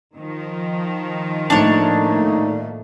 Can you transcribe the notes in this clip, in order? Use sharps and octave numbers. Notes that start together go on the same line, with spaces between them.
D#3 F3
A2 A3 A#3 D4 D#4 C#5